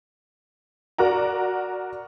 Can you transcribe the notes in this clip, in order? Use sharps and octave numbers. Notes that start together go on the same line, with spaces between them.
F#4 A#4 D5 F#5 A#5